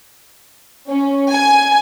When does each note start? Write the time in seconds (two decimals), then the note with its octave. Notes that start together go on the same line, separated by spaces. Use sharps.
0.89 C#4
1.32 G#5